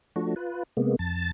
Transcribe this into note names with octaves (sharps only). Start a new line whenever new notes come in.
F3 A3 D4 F#4
F4 B4
C3 G#3 A#3 B3
F2 A5 A6